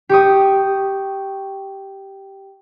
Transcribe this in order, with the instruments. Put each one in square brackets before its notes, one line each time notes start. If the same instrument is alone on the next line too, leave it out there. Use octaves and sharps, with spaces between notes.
[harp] G4 C#6 D#6